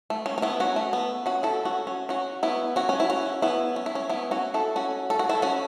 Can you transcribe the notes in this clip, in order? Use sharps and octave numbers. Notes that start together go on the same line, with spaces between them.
A3
C#4
C#4
B3 E4
C#4 F#4
A3
B3
C#4 F#4
E4 A4
C#4 F#4
C#4
C#4 F#4
B3 E4
C#4 F#4
C#4
E4
C#4 F#4
B3 E4
C#4
E4
C#4
B3 E4
C#4 F#4
E4 A4
C#4 F#4
A4
F#4
E4 A4
C#4 F#4